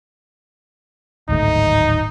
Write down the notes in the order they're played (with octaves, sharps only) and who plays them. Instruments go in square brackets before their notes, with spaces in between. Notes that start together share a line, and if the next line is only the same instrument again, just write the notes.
[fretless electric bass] D1 G#1 A3 [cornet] D#4